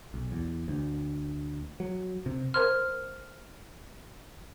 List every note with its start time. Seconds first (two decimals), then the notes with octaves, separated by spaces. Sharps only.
0.14 B1
0.32 E2
0.68 D2
1.80 F#3
2.26 C3
2.54 A#4 C5 C6 F6